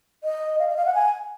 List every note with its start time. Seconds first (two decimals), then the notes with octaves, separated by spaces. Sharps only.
0.24 D#5
0.59 F5
0.68 D#5
0.77 F5
0.86 F#5
0.95 G#5